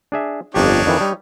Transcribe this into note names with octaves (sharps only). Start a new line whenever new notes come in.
D4 G#4 E5
G1 F2 D4 D#4 G4 C#5
F2 D#3 E3
G3